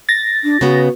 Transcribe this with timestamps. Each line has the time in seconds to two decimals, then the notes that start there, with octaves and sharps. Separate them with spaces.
0.09 A6 A#6
0.44 D4
0.61 C#3 B3 F#4